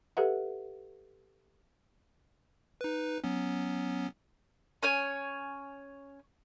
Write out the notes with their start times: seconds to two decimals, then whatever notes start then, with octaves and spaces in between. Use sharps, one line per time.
0.17 G4 A4 B4 E5 F#5
2.81 D#4 B4
3.24 F#3 B3 C#4
4.83 C#4 C#5 G#5